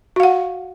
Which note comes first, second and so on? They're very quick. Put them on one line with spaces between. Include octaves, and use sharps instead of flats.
F#4 F5 F#5